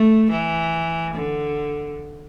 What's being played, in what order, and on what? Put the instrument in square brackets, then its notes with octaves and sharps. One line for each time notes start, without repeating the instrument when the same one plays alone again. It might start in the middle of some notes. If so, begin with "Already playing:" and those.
Already playing: [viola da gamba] A3
E3
D3